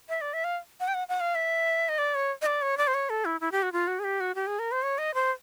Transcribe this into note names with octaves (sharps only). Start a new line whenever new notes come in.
E5
D5
E5
F5
F#5
G5
F#5
F#5
F5
E5
D#5
D5
C#5
D#5
D5
C#5
D5
C5
C#5
A4
E4
E4
G4
F#4
F4
F#4
G#4
G4
F#4
G4
G#4
A#4
C5
C#5
D#5
C5